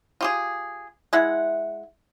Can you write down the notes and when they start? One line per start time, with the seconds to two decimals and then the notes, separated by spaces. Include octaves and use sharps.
0.21 F4 G4 G#4
1.13 G#3 E4 F#5